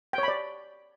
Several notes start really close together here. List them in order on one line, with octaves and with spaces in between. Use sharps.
G5 C#5 B5 D5